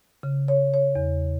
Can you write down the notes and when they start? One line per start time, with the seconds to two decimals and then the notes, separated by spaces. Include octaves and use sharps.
0.23 C#3
0.48 C#5
0.74 C#5
0.95 E2